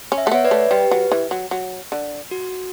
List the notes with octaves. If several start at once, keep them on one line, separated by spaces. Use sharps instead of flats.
C#4
E5
A3 F#5
B3 C#5 E5
B4 D5
A3
G3 G4 B4
F#3
E3
F#3
F#3
D3
F#4